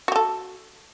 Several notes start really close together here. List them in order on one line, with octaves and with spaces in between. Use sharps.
F#4 G4 A4